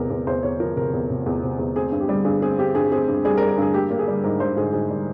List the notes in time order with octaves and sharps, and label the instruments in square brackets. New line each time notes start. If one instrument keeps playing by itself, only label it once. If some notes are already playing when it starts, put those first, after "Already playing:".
Already playing: [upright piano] E2 C3 A#4
E2
E2 C5
E2 C#5
F3 A#4
C3 A#4
E2
C3
E2
C3
E2
C4 G#4
G2
G4
G3
G2 G#4
C4 G#4
C4 G4
G2 G#4
C4 G#4
G2
G3 G#4
A#4
G3
A#4
G2 G#4
A#3 G4
A#3
G#4
G3
G#2 A#4
G3 C5
G#2 G#4
G#2 G#4
G3